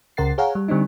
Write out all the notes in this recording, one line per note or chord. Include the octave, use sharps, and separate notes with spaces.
C#2 C#3 A#4 F#5 A6 C7
G#4 C#5 F5 F#5 G#5 A#5
G3
D3 G3 C4 D4 D#4